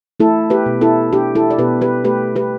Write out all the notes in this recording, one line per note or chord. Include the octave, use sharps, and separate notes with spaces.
A3 E4 A4
G4 B4
B2
E4 A4
D4 G4
E4 A4
D5
B2 G4 B4
G4 B4
A3 G4 B4
G4 B4